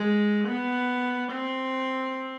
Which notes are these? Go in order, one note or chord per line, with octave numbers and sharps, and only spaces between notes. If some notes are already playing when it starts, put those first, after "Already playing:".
Already playing: G#3
B3
C4